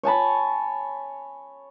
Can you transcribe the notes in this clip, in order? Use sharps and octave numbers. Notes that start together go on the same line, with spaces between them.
C#5 G#5 A5 B5